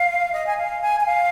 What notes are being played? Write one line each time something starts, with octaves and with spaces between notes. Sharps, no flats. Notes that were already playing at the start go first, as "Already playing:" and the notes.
Already playing: F5
D#5
G#5
F5
G#5
G#5
F5